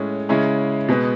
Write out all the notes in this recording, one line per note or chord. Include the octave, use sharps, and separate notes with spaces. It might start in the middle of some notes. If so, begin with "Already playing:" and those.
Already playing: A2 G#3 C#4
C#3 G#3 C#4 E4
B2 G#3 B3